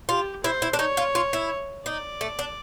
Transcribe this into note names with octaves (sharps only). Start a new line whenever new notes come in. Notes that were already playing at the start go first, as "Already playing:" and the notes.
F4 G4
E4 C5
E4
D4
D#4 C#5
F4
F4
E4
D#4 D5
A3
D4